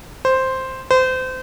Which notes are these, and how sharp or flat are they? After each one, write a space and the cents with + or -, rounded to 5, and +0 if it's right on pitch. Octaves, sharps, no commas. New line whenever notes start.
C5 +0
C5 -30